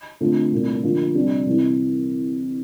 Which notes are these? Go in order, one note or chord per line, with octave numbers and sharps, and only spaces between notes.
D3 A3 C4 F4
C2 A#2 A3
D3 F3 A#3 F4
C3 G3 D4
C2 C3 E3